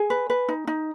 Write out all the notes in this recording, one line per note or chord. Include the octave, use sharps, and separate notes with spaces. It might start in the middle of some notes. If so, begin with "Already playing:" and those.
Already playing: G#4 G#5
B4
B4
D#4
D#4